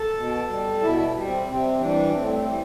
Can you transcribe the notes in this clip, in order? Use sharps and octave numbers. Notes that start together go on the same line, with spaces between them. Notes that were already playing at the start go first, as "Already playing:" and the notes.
Already playing: A4
B2
G3
B2 E4
G3
C4
C3 C4
E3 G3 D4
A2 C4
E3 G3